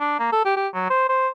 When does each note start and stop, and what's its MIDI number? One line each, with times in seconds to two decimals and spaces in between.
0.01 0.15 62
0.19 0.31 58
0.32 0.42 69
0.45 0.56 67
0.56 0.68 67
0.74 0.86 54
0.90 1.06 72
1.09 1.28 72